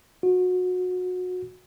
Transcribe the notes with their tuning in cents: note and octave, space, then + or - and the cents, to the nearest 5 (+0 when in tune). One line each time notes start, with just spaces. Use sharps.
F#4 -25